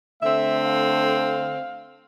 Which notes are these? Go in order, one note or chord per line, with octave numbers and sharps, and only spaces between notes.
D3 A3 C4 E5
F5